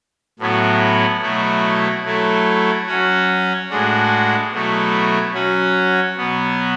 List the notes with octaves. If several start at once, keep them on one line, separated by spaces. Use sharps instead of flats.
A2 F#3 B3 E4
B2 F#3 A3 E4
F#3 A3 E4
F#3 C#4 F#4
A2 G#3 D4 F#4
B2 F#3 A3 E4
F#3 C#4 F#4
B2 F#3 B3